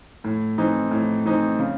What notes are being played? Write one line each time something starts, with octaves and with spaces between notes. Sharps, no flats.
A2
E3 C4 D#4
A2
E3 C4 D#4
C#3